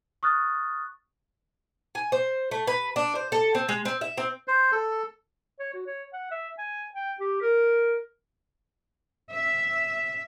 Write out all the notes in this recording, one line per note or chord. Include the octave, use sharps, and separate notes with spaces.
C#6 D#6 F6 F#6 A6
G#5
C5
A3
B4
D4
C5
A4
C4
G#3
C4
E5
C4
C5
A4
C#5
F#4
C#5
F#5
E5
G#5
G5
G4
A#4
E5